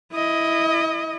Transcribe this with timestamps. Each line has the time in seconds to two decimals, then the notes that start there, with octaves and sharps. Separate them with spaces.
0.13 E4 D#5